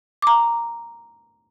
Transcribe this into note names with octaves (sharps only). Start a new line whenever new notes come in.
A#5 D6